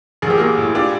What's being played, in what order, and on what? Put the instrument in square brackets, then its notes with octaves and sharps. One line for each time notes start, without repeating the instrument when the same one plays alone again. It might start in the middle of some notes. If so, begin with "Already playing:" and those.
[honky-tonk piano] A1 [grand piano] G#4
[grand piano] G4
[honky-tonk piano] A#3 [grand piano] F#4 G#4
[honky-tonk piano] A2
[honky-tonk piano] D4 [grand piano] F4 G4